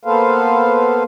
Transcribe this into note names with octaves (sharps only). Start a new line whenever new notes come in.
A#3 B3 A4 B4 C5 F5